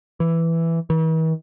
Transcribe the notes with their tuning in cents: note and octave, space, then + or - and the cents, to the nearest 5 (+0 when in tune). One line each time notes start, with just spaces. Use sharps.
E3 +5
E3 -45